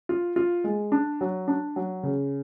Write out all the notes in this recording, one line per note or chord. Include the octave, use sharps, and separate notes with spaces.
F4
F4
G#3
D4
F#3
D4
F#3
C#3